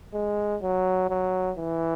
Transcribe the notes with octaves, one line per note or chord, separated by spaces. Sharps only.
G#3
F#3
F#3
E3